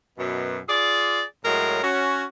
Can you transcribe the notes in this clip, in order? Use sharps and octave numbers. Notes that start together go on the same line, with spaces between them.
F#2 B2
F4 G#4 D5
A2 F#3 G#3 A#4
C#4 F#4